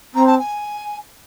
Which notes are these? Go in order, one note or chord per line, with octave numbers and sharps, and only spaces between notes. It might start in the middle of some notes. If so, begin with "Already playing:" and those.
C4 A#5
A5
G#5